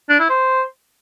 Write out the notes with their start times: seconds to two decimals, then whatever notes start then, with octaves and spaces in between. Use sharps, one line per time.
0.09 D4
0.20 E4
0.30 C5